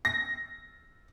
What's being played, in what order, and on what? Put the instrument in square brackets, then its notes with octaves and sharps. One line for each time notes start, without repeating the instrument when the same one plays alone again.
[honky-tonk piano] A#6